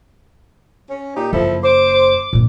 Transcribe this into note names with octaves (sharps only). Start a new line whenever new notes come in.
C#4
A#2 D#4 G4
F#1 F3 E4 A4
C5 D6
A#2 D4